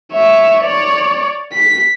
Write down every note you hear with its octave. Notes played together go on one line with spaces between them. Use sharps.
C#5 E5
C#5 D5
B6